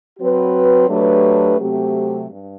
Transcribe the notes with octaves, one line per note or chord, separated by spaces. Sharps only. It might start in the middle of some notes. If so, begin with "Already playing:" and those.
F#3 C4 F#4 B4
F#3 A3 D4 G4 B4
C3 F#3 A3 C4 G4
G2